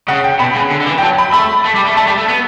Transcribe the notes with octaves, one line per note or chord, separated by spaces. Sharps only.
C#3 F#5
G5
B2 B5
C#3
D3
D3
E3
G5
F#3 A5
B5
A3 B5
A3
G3
A3
A3 A5
G3
A3
B3